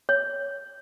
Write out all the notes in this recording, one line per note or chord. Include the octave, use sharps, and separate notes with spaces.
C#5